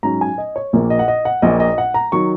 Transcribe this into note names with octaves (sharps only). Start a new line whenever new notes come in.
G#2 F#3 C#4 A#5
G#5
D#5
C#5
A#1 A#2 A#3
D#5
F#5
D#5
F#5
A#1 A#2 A#3 D#5
D#5
F#5
A#5
D#3 F#3 C#6